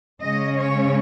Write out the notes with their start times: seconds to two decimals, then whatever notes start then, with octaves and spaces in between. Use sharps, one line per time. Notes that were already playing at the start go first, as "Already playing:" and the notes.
0.22 C#3 G#3 C#4 D#5
0.58 C#5